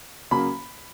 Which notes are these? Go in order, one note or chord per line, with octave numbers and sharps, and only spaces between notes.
C#3 F#3 A#3 B5